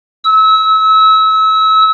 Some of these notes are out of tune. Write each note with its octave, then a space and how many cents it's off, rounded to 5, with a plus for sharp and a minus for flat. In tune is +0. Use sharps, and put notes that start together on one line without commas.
E6 -30